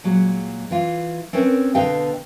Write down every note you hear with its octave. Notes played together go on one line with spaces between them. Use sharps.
A#2 F#3 G#3
E3 F4
C4 C#4 A#4 B4 C#5
B2 D3 B4 D#5 F5 G5